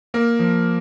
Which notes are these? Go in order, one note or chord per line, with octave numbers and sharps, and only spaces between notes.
A#3 A#4
F3